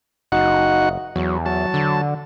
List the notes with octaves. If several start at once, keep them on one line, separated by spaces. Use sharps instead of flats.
F#1 D#4 F#4 F#5
E2 F#3
F#3 A5
D3